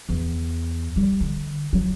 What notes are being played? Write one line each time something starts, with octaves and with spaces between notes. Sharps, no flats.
E2
G3
D3
F#3